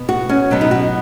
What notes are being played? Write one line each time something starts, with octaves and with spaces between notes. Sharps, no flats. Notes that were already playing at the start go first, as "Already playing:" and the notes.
Already playing: B2 B3
F#4
C#4
B2 F#3 B3
D#4
F#4